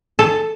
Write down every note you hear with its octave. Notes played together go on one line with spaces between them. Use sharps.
A4